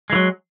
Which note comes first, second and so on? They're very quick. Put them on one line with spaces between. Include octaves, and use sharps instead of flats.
G#3 E3 F#3